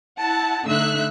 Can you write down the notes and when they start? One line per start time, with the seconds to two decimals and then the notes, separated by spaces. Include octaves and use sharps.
0.19 E4 F#5 A5
0.66 D3 A3 D#4 E5 E6 F#6